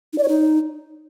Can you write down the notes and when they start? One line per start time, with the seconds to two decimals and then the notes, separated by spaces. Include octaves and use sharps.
0.13 D#4
0.18 D5
0.23 C#5
0.28 D#4